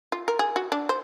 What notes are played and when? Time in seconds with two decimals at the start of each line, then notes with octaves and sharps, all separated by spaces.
0.12 F4
0.28 A#4
0.39 G#4
0.56 F#4
0.72 D4
0.89 C5